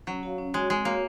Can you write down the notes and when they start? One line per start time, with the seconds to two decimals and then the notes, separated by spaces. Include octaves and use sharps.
0.07 F#3 C#4
0.23 F#4 C#5 F5
0.38 C#4
0.54 G#3 F#4 C#5
0.70 G#3 C4
0.85 A#3 F#4 C#5 F5